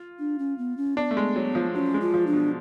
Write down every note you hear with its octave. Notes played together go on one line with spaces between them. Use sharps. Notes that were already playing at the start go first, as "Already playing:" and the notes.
Already playing: F4
D4
C#4
B3
C#4
B3 D4
A3
G#3
F#3
F3
F#3 C#4 D4
G#3
F4
F3
D4
B2